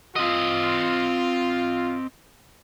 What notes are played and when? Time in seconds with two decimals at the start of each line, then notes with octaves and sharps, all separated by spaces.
0.16 C4 F4 D#5